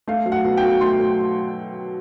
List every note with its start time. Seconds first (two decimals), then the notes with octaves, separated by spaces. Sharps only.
0.07 A3 F5
0.26 F#3
0.32 F#5
0.45 B2
0.57 G5
0.63 B2
0.81 A3 C6
0.99 F#3